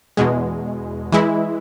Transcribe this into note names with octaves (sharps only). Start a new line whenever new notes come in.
E2 B2 G#3
E3 G#3 E4